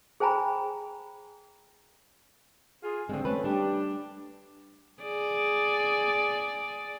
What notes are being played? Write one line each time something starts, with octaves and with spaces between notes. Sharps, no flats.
G#4 C5 G5 G#5 A#5 B5
F4 G#4
G2 D3 G#3 C4
A3 C#4 B4
G3 D4 G4
G#4 D5